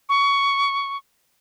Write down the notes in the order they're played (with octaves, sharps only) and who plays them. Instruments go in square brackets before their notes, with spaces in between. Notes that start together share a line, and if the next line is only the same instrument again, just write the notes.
[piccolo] C#6